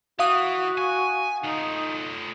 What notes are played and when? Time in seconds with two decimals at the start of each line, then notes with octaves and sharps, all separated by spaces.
0.19 E3 F#4 F5 D#6
0.78 G#5
1.44 A3 D#4 F4